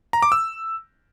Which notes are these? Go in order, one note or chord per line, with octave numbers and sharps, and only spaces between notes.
A#5
D6
E6